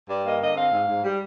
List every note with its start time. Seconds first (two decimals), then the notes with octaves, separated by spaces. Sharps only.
0.09 G2 D5
0.24 A#3 D#5
0.40 D3 D#5
0.56 C4 F5
0.72 G#2
0.87 G#2
1.03 G3